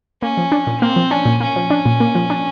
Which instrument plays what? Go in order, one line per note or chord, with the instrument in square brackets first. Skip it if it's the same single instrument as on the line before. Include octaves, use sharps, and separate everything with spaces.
[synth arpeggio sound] A#3 [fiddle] C#4
[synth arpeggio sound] F3
D4
A#2
[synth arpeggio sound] A#3 [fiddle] C4
[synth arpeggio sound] F3
[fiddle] C#4 [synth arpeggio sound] D4
[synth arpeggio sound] A#2
[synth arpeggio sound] A#3 [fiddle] C#4
[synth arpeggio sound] F3
D4
A#2
A#3
F3
D4